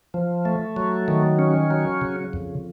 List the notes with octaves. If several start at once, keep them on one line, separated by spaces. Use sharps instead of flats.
F3
A3
F#3
D#3
C#4
F#3
C#3
F2